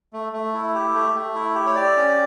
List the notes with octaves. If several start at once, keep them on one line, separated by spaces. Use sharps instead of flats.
A3
A3
E4
G4
A3
A3
E4
G4
C#5
G4 D5
C#4